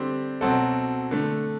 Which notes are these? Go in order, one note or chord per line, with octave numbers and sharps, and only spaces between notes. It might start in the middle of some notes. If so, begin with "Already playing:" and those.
Already playing: D3 G3 C4 G4
B2 F#3 C4 F#4 A4
D3 A3